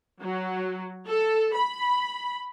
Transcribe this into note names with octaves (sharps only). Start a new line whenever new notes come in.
F#3
A4
B5